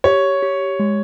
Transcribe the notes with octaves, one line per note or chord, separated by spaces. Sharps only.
G4 C#5
G4
G#3